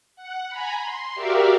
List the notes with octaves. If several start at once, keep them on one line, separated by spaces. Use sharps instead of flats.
F#5
G#5 A#5 B5
C6
F#4 G4 A#4 D5 E5 F5